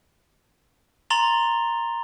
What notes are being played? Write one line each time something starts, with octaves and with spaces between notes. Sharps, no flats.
A#5 C6 A6 F7 G7